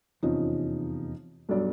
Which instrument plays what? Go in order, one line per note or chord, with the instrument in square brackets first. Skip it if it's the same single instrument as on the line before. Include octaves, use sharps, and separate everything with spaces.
[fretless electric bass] F1 E2 C3 [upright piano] F3 C#4 D#4
[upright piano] B1 G2 D5